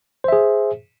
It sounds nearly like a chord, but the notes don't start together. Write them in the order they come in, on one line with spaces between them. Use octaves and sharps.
C5 E5 G#4